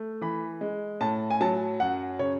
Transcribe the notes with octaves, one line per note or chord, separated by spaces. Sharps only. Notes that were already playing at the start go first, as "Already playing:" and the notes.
Already playing: A3
E3 B5
G#3
A2 A5
G#5
F#3 A5
F#2 F#5
C#3 C#5